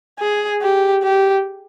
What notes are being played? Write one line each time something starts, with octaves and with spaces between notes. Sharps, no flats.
G#4
G4
G4